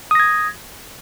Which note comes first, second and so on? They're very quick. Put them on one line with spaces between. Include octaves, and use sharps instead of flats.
D#6 A#6 G#6